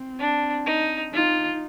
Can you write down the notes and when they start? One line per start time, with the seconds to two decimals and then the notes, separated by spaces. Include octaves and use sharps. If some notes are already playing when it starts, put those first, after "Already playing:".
Already playing: C4
0.19 D4
0.66 D#4
1.12 D#4 F4